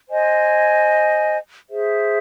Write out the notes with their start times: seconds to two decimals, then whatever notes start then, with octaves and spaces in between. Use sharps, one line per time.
0.08 C5 D#5 G#5
1.69 G#4 C5 E5